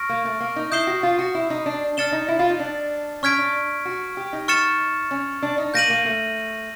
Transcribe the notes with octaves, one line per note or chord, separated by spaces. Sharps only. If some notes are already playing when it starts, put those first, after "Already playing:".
Already playing: C#6 F6 A#6 D7
A#3
A3
A#3
D#4
E4 D#6 G6 C7 E7 G7
F#4
F4
F#4
E4
D#4
D4
D4 F6 A6 C#7 E7 G7
D#4
E4
F4
D#4
D4
C#4 C#6 F6 G#6 B6 D7
D4
F#4
G4
D#4
C#6 F6 A6 C#7 E7
C#4
D4
D#4
A#3 G6 A#6 D#7 F#7
A#3
A3